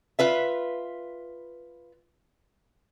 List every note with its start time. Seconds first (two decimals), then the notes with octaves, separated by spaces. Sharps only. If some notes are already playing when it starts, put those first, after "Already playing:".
0.19 F4 B4 E5